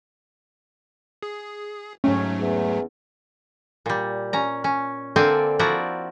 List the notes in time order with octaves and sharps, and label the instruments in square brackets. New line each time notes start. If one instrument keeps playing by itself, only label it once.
[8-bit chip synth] G#4
[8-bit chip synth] G#2 F#3 A3 [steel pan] C#4
[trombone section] E2
[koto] A#2 G3
C#4 A#5
C#4
D3 A#3 C4 D5 G#5 A5
F3 E4 F#4 D5 A#5